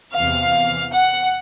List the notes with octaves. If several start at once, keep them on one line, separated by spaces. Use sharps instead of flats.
E2 C3 E3 F5
F#5